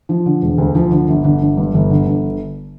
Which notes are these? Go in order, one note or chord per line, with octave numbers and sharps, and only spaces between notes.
F3
D3
E1
D2
F3
D3
G1
D3
G1
G2
G1
D3
G1